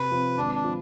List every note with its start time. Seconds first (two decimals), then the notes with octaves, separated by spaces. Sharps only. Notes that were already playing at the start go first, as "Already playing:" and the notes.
Already playing: C3 B4
0.11 F3 C4 F4
0.37 G#1 D4
0.55 D4
0.64 F3